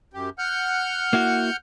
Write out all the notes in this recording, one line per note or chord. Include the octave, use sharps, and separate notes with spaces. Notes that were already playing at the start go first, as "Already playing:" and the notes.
F#2 G4
F#5 F6 G6
A#3 E4 F#4